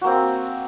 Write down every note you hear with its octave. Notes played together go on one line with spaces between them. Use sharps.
A#3 C4 F#4